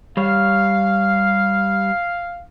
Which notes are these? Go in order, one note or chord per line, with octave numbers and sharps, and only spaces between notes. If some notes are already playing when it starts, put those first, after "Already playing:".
G3 C#5 F5